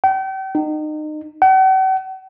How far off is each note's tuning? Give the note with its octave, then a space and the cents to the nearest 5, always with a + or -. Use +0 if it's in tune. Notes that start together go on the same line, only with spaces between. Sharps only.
G5 -40
D#4 -30
F#5 +45